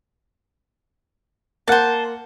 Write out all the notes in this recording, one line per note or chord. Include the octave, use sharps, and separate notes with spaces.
A#3 C5 F#5 A5